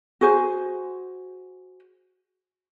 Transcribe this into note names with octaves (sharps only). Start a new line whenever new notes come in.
F#4 G#4 C5